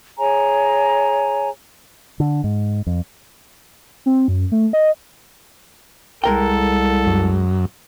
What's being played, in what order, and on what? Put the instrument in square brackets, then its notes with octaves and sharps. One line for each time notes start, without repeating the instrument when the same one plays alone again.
[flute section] G#4 C#5 G#5 A#5
[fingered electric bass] D3
G#2
F2
[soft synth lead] C4
F#2
A3
D#5
[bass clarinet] C2 [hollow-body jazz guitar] G#3 A#4 G5 [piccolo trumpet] A4
[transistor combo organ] F#2